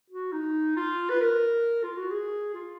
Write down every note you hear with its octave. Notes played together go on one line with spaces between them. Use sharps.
F#4
D#4
F4
B4
A#4
F4
F#4
G#4
F4